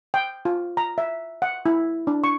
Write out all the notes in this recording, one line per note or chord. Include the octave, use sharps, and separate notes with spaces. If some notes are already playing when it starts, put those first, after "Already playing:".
G5
F4
A#5
E5
F#5
E4
D4
C#6